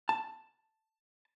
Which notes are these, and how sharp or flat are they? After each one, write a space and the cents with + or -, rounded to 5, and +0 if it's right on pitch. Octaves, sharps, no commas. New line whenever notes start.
A5 +5